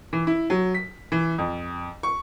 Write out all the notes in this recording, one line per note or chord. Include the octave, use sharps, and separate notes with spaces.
E3
E4
F#3
B6
E3
F2
C#6